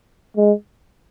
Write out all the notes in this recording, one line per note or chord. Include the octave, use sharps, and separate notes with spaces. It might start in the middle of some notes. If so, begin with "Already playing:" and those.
G#3